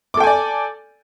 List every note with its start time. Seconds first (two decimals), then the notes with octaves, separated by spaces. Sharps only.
0.14 D6
0.17 A4
0.20 G5
0.24 G#5
0.27 D5